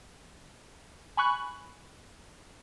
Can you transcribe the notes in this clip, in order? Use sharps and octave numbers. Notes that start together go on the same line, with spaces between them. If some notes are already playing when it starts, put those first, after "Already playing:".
G#5 B5 C#6 F#6